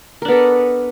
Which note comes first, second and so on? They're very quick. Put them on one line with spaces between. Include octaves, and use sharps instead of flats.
A#4 D4 B3 A4